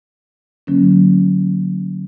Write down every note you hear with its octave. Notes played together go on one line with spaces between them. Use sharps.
D3 F#3 A#3 C#4